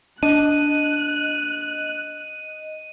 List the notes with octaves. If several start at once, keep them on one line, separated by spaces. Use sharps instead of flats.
D4 D#5 F#6 D#7